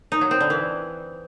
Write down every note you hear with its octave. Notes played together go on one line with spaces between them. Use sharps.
D#4
F#3
C4
D3
E3